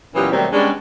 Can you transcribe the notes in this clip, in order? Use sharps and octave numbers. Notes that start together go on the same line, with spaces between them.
A#2 E3 F#3 B3 C#4 G4
B2 D#3 F#3 G3 A3 C4
G3 G#3 B3 C#4 D4